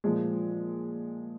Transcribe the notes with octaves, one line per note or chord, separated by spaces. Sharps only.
A#2 F3 G#3